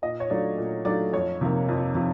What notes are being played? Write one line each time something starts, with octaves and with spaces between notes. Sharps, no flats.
A#2 D#5
C#5
F#3 A3 D4 F4 D5
A#2
F#3 A3 D4 F4 D5
F2 C#5
C3 F3 A#3
F2
C3 F3